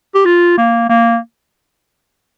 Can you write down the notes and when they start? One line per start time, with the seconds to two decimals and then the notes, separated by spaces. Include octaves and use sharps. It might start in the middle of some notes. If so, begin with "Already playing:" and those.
0.15 G4
0.25 F4
0.58 A#3
0.90 A#3